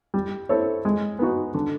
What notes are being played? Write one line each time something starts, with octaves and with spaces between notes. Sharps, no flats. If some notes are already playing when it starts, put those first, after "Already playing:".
G3
C4 E4 A4 C#5
G#3
B3 D#4 F#4
D3